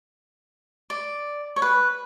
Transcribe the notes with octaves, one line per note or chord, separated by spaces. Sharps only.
D5
C#5
B4